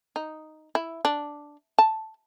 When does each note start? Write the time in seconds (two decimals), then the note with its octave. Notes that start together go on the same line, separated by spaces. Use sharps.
0.16 D#4
0.75 E4
1.05 D4
1.79 A5